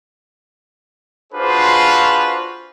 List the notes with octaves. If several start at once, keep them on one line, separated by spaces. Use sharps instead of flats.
D4 F4 F#4 G#4 B4 C5